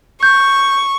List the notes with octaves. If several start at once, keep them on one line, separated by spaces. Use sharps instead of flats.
C#6 G6